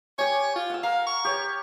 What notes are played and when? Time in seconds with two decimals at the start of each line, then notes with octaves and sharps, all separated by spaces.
0.18 G4 C#5 G#5
0.56 F4
0.70 F#5 E6
0.83 A#4 F5
1.07 C#6
1.25 G4 C#5